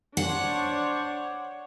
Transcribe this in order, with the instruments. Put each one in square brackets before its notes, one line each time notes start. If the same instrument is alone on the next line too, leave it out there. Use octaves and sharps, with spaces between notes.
[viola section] D4 C5 C#5 [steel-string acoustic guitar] F#5